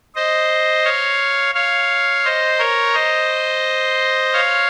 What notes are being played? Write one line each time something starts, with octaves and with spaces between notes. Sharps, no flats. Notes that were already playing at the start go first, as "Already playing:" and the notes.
C5 D#5
C#5 F5
C#5 F5
C5 D#5
A#4 C#5
C5 D#5
C#5 F5